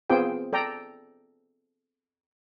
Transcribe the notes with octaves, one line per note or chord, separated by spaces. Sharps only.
B3 C4 F4 G#4 C5 G5
A4 D5 G5 A#5